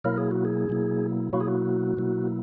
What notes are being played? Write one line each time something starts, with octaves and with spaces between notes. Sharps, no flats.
B2 F#3 A#3 E4 A#4
G#4
F#4
G#4
B2 F#3 A#3 E4
B2 F#3 A#3 E4 F#4
G#4
F#4
B2 F#3 A#3 E4